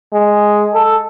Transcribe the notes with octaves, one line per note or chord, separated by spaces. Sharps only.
G#3
A4